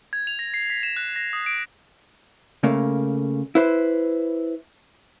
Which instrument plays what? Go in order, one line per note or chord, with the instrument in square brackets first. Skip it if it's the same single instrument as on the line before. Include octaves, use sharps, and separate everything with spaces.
[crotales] G#6
F7
A#6
C7
B6
E7
F#6
A#6
D#6
D7
[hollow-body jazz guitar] C#3 A3 A#3
E4 B4 C5